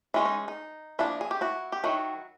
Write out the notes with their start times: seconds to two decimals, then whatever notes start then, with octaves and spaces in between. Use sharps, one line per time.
0.14 E3 G#3 C#4 E4
0.25 D#4
0.48 D#4
0.99 F3 A#3 D4 E4
1.21 G#4
1.31 G4
1.41 E4 F#4
1.72 G4
1.84 D#3 F#3 E4 F#4